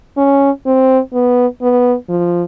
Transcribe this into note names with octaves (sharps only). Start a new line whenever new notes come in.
C#4
C4
B3
B3
F3